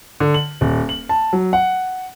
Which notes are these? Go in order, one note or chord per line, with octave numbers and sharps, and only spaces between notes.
D3
F#7
D#1
F#7
A5
F#3
F#5